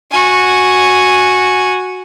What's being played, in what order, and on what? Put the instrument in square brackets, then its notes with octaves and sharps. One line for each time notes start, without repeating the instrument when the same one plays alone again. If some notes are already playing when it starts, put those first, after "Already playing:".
[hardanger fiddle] F#4 G#5